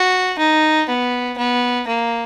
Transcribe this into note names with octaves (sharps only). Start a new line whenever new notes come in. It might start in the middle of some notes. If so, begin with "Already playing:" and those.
Already playing: F#4
D#4
B3
B3
A#3